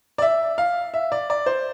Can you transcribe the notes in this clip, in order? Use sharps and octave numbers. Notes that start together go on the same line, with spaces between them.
D5
E5
F5
E5
D5
D5
C5